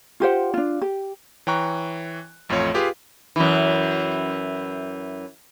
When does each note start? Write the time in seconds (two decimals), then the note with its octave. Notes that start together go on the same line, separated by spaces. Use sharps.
0.20 F4 G4 C5 F#5
0.54 D4 F4
0.82 G4
1.47 E3 C#5 G5 A#5 C#6 F#6
2.49 A1 F2 A3 F4 C#5
2.74 F4 G4 G#4 B4 F5
3.36 F#2 E3